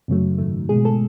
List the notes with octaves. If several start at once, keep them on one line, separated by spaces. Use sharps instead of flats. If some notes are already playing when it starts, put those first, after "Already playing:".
F#2 C#3 F#3 A3
G#2 D#3 A3
B2 G#3 G#4
A4